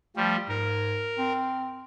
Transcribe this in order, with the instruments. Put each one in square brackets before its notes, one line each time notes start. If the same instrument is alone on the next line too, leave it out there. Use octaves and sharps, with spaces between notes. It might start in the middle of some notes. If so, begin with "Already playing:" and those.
[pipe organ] F3 G3 [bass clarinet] A3
[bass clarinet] G#2 [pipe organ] A#4
[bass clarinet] C4